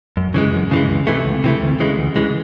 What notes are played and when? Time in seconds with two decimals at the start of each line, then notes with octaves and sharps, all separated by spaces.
0.17 F#2
0.34 C#3 E3 G#3
0.54 F#2
0.71 C#3 E3 G#3
0.89 C#2
1.07 C3 E3 A3
1.25 C#2
1.44 C3 E3 A3
1.61 D2
1.80 C#3 E3 G#3
1.98 D2
2.16 C#3 E3 G#3